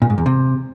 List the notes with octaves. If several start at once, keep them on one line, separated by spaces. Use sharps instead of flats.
A#2
G#2
E2
C3